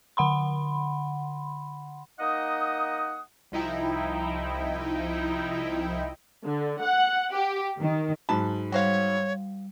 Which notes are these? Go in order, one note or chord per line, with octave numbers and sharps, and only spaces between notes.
D3 F#5 B5 C6
A#3 D#4 D#5 F#5 D#6
C2 F3 D#4 E4 G5
D3
F#5
G4
D#3
G#2 F#3 A5 B5
G3 F#4 C5 C#5 F5